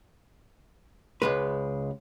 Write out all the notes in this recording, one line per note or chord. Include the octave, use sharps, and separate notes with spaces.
C#2 G#3 B4